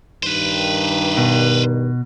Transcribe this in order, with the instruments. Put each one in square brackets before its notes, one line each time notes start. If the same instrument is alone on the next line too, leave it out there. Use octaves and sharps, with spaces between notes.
[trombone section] G2 D#3 [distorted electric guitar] B4 C5
[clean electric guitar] B2